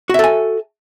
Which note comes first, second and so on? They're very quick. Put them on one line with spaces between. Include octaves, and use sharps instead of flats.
F#4 E5 A4 G#5